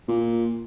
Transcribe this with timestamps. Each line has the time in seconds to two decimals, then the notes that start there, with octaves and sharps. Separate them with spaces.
0.08 A#2